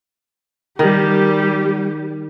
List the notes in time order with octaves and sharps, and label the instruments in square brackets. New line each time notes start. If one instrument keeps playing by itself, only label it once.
[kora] D#3 [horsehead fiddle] G3 G4